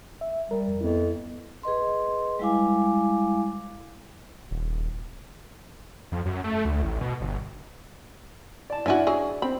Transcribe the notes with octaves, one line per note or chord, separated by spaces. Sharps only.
E5
G3 A#4
F2
F2 B3 E4
G#4 B4 D#5 C6
G3 G#3 E4 F5 G#5 D6
D#1
F2
F#2
A3
D2
A1
B2
G1
D5 A5
C#4 D4 E4 F#4 D5 G#5
F#3 G#4
C4 B5